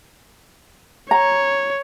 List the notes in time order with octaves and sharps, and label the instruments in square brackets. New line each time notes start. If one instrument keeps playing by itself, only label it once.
[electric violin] C#5 [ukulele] A#5